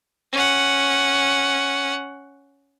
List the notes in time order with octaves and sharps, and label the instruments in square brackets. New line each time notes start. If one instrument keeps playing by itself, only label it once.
[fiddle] C#4 F#5